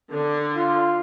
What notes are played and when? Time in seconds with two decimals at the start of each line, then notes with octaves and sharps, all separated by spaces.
0.11 D3
0.55 F4